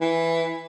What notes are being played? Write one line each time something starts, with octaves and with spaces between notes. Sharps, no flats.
E3